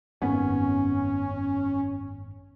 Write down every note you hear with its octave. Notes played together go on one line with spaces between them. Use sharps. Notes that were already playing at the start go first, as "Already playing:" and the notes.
G#1 F#2 B3 C#4